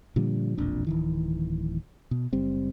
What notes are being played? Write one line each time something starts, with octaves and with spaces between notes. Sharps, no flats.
A#2 D3 F3 G3
E1 A#1 F2 D4
D1 D#3 E3
B2
F#1 G3 C4